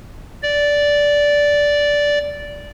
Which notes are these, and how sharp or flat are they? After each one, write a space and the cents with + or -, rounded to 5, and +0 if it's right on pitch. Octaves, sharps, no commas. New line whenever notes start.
D5 -10